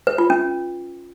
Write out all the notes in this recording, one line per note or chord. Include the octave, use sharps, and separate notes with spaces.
B4
F4
C#4